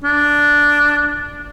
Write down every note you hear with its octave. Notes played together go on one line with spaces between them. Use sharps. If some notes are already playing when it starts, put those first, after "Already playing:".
D4